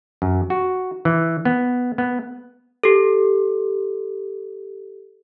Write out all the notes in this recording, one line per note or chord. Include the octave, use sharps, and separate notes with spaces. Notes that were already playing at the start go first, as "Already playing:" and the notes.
F#2
F#4
E3
B3
B3
G4 A4